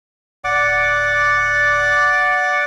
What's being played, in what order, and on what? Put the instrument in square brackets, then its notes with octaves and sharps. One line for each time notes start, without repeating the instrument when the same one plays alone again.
[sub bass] D1 [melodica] D5 F#5 D6